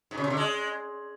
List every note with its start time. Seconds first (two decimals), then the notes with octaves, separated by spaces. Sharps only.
0.11 G#2
0.17 C#3
0.24 C3
0.30 D3
0.37 G#3